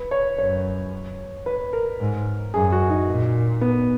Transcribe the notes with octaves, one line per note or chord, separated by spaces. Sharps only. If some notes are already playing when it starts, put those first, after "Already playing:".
Already playing: B4
C#5
F#2 C#5
B4
A#4
G#2
F#2 G#4
F#4
D#4
A#2
B3